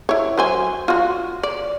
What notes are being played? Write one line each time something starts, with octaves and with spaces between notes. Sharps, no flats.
E4 C#5
F#3 C5 G#5
F4 F#4
D5